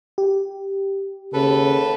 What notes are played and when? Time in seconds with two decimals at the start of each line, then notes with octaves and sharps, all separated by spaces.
0.18 G4
1.33 D#2 C#3 A4 B4